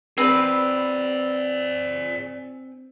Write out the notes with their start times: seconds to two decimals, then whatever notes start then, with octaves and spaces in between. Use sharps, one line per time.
0.18 C4 G#4 B4 D5